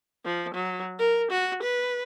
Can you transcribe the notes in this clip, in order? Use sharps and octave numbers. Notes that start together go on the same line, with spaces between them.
F3
F#3
A#4
F#4
B4